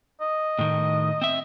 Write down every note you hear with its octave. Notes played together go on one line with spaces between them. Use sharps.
D#5
A2 D#3
C4 E5